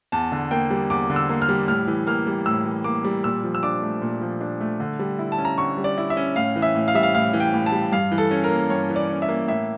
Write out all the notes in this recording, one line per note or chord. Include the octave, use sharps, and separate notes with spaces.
E2 A5
D3
A#3 G5
G3
E2 D6
D3
E6
A#3
F6
G3
A2 F6
E3
A#3 F6
G3
A2 E6
E3
A#3 D6
G3
A#2 E6
F3
E6
D4 D6
A3
A#2
F3
D4
A3
D3
G3
E4
A5
C#4
A#5
D3 C#6
G3
D5
E4
E5
C#4
A2 F5
E3
E5
A2
F5
G3 E5
F5
A2 F5
E3
G5
A2
A5
G3
G2 F5
E3
A4
C#4
A#4
A#3
G2 C#5
E3
D5
C#4
E5
A#3
A2 E5